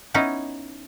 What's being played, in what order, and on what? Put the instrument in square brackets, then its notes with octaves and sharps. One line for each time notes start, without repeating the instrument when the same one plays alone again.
[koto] B3 C#4 D#4 E4